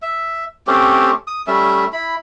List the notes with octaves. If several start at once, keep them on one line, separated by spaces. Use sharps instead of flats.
E5
A3 C4 C#4 G4
D#6
G3 A3 C#4 E5
E4 B5